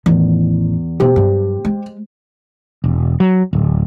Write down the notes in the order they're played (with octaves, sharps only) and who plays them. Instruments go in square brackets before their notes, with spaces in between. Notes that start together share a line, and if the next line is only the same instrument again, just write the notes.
[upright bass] A1 D#3 [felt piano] E2
[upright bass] B2 B3 [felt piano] G4 C5
[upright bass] G2 F#3
G#3
[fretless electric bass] E1
F#3
D1